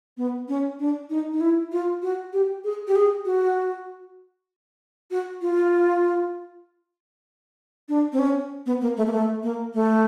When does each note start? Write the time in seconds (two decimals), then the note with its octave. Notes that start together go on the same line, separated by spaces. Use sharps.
0.17 B3
0.48 C#4
0.79 D4
1.10 D#4
1.33 D#4
1.40 E4
1.72 F4
2.02 F#4
2.33 G4
2.64 G#4
2.87 G4
2.96 G#4
3.25 F#4
5.11 F#4
5.42 F4
7.89 D4
8.13 C4
8.19 C#4
8.66 B3
8.81 A#3
8.97 A3
9.07 A#3
9.12 A3
9.43 A#3
9.74 A3